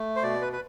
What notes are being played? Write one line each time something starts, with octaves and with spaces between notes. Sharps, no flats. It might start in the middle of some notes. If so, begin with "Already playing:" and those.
Already playing: A3
C5
B2 D5
B4
B4